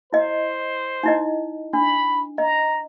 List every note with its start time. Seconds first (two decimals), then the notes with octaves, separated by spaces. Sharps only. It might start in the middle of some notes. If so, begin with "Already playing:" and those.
0.13 E4 C5 D#5
1.03 D#4 E4 D#5
1.73 D4 B5
2.38 D#5 A#5